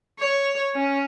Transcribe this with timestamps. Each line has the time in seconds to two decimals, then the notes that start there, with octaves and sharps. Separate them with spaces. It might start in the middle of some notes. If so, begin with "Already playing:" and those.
0.19 C#5
0.75 C#4